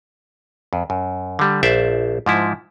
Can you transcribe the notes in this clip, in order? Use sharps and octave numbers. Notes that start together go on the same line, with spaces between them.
F2
F#2
D3 G3
A#1 C5 D5 E5
G#2 F3 E4